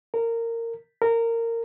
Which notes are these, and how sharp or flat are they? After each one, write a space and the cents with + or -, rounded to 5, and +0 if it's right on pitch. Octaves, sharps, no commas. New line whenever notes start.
A#4 -20
A#4 -20